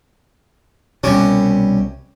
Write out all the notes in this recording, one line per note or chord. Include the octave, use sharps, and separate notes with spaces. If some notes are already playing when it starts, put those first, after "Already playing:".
C2 B2 C#4 G4